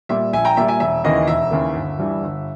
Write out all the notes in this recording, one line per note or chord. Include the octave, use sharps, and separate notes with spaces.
A#2 G3 E5
A#1 E5 G#5
G5 A#5
A#2 G3 E5
E5 G#5
E1 E5
D#2 C#3 E3 A#3 D#5
E1 E5
D#2 C#3 E3 A#3
G1
G2 E3 G3
G1